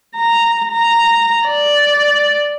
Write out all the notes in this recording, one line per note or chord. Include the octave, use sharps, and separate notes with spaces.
A#5
A#5
D5